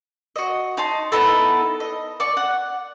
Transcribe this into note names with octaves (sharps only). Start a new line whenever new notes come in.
F#4 D#5
D#4 A5 C6
B3 D#4 E4 A4
D#5
D5 G5 C#6
F#5